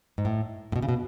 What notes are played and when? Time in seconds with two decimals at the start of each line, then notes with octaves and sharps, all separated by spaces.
0.18 G#2
0.25 A2
0.72 A2
0.76 B2
0.82 C#3
0.89 B2